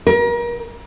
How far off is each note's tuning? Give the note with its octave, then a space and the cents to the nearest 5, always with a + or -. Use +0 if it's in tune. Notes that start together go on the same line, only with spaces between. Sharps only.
A#4 +35